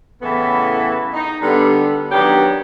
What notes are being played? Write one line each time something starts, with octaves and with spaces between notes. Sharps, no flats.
A2 C#3 E3 A3 B3
D#4
D3 G3 B3
D#3 F#3 B3 C#4 D4 G4